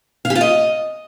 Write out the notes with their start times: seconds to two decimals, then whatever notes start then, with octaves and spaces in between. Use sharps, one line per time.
0.25 F5
0.30 G4
0.35 F4
0.41 D#5